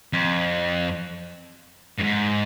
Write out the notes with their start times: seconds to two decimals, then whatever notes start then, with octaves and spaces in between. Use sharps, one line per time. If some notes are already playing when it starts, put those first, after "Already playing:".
0.13 F2
1.98 G2
2.02 G#2